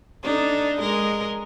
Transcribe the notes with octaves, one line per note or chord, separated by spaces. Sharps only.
D4 D#4 A4
G#3 A#4 D#5